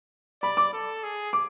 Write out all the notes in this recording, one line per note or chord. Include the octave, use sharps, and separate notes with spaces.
D5 B5
D6
A4
G#4
D6